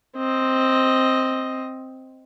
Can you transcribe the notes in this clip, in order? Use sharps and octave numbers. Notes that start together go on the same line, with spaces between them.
C4 D#5